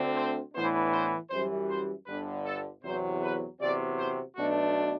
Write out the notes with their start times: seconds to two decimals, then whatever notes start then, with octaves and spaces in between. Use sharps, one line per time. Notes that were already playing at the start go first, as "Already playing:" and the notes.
Already playing: D2 D3 A3 C4
0.17 C5
0.54 A2 E3 B3 D4 C5
0.92 C5
1.30 F#2 E3 G3 C5
1.69 C5
2.07 G1 G2 D3 B4
2.45 A4
2.83 E2 C3 F#3 C5
3.22 B4
3.60 E2 C3 F#3 C4 D5
3.97 C5
4.35 B1 B2 A3 D4 F#4